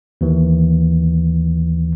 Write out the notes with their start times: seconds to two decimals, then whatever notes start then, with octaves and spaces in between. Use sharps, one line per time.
0.21 D#2 E3